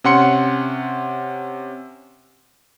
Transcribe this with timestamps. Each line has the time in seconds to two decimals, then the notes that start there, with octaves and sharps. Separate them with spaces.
0.04 C3 C#4 F#5 C6 C#7